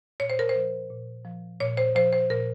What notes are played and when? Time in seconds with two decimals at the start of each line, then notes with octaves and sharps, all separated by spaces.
0.20 A#2 C#5
0.30 C5
0.39 A#4
0.49 C5
0.55 F3
0.90 A#2
1.25 F3
1.60 A#2 C#5
1.77 C5
1.95 F3 C5
2.13 C5
2.30 A#2 A#4